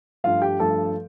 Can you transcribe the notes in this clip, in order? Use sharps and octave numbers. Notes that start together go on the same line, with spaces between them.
G2 F3 A3 F4 F5
G4 G5
G2 F3 A3 A4 A5